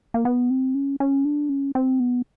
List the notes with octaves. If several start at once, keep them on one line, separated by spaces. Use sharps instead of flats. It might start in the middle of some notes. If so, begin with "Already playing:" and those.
A#3
B3
C4
C#4
C#4
D4
C#4
C4
B3